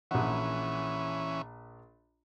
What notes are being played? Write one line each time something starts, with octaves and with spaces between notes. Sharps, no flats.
A#1 E3 C#4 F#5